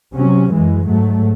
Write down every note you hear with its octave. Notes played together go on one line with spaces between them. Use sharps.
C3 F#3 C#4
F#2 E3 G#3
G#2 F#3 A3